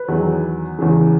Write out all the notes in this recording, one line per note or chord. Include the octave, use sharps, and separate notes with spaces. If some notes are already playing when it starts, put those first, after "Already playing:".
Already playing: B4
E2 D#3 F#3
E2 C#3 E3 G#3